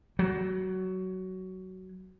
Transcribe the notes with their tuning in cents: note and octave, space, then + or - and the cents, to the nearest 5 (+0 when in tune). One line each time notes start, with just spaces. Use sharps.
F#3 +15